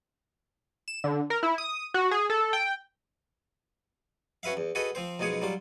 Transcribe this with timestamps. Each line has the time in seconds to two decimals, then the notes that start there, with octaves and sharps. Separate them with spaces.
0.88 E7
1.04 D3
1.30 A#4
1.43 E4
1.58 D#6
1.94 F#4
2.11 G#4
2.30 A4
2.53 G5
4.43 C#4 F#4 B4 E5 F5
4.57 E2
4.75 F#4 G#4 A4 B4 D#5
4.95 F3 C4 C5
5.19 B1 F2 B2 G#3 G#4 C#5
5.42 F#3 G3 F4